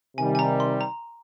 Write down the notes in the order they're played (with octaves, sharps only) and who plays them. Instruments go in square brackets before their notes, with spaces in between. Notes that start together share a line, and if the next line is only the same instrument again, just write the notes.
[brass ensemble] C3 D#3 G3 [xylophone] G#5
[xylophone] G#5
A#5
C6
A#5